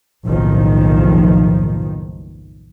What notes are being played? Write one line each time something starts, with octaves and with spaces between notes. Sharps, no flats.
F#1 B1 A2 D#3 F3